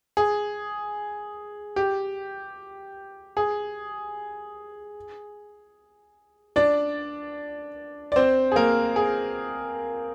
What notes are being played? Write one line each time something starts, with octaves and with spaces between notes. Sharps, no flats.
G#4
G4
G#4
D4 D5
D5
C4 C5
G#4
A#3 A#4
G#4